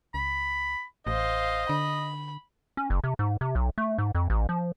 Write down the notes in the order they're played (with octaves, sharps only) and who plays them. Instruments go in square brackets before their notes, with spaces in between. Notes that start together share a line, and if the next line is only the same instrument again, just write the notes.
[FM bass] C#2 [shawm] B5
[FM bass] A1 [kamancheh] C5 F5 [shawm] D#5
[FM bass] D3 [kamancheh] B5
[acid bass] C#4
F#1
C3
G#2
C3
B1
A3
G#2
F2
A1
F3